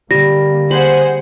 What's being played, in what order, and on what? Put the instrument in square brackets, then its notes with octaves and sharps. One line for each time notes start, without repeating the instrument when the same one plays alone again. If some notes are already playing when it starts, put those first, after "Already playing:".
[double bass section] D3 A#3 [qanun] G3 [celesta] A#6
[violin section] G#4 C5 F#5 [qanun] B5